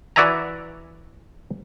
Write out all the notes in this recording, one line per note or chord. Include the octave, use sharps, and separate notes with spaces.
E3 F#4 D5 E5 G#5 A#5